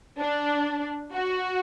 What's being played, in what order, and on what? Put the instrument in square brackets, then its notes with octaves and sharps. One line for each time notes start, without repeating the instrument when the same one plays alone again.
[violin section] D4
F#4